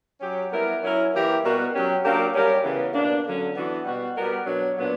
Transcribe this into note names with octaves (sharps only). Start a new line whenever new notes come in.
F#3 C#4 G4
G3 B3 E4 A#4
F#3 C#4 E4 A#4
E3 A#3 E4 G4 A#4
B2 G3 B3 F#4 A#4
F#3 C#4 G4
F#3 A#3 D4 G4 A#4
G3 C#4 G4 A#4
C#3 E3 B3
B2 A#3 D4
D3 F#3 C#4
E3 B3 D4 F#4
B2 G3 B3 F#4
G3 B3 F#4 A#4
B2 F#3 B3 D4 F#4
A#2 F#3 B3 D4